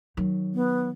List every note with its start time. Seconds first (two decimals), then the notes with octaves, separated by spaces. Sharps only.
0.17 D#3 F#3
0.54 B3